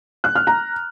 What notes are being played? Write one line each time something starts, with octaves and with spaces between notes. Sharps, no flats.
F#6
F6
A#5